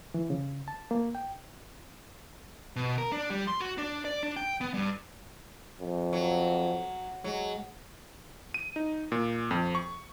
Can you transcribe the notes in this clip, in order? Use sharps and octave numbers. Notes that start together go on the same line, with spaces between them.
E3
C#3
A5
A#3
G5
B2
A#4
D4
G3
C6
F#4
D4
D5
D4
G5
B3
G2
F2
F#3
F#3 G#3
D#7
D#4
A#2
F2
C#6